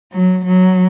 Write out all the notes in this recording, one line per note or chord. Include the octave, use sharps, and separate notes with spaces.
F#3
F#3